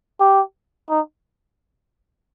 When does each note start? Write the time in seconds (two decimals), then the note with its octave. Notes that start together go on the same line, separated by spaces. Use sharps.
0.20 G4
0.90 D#4